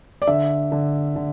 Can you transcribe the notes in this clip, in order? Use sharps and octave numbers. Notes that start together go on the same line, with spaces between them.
D5
D3 E5
D3
D3